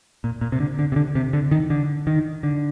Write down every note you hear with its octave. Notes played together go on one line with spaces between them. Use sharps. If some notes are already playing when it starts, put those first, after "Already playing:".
A#2
A#2
C3
D3
D3
C3
D3
C3
D3
D#3
D3
D#3
D3